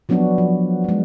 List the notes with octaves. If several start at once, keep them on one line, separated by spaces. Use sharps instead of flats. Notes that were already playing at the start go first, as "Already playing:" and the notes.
F3 F#3 B3 D4 F#4
F3
F#3 G#3